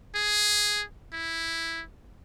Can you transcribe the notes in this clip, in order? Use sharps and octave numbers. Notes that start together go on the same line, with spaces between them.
G#4
E4